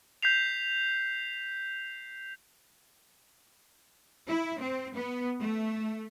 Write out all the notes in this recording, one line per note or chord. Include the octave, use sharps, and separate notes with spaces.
G6 B6 C7 F7
E4
C4
B3
A3